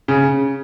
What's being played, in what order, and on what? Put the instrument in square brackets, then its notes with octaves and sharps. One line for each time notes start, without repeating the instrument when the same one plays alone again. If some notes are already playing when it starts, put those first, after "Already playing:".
[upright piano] C#3